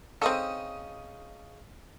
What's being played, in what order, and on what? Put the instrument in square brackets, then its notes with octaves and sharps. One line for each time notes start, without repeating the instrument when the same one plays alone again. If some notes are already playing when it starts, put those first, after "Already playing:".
[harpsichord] C#3 C#4 D#4 [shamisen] C4 A4